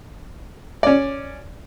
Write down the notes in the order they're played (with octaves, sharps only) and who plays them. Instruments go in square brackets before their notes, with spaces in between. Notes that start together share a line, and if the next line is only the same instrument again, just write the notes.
[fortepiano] C#4 D5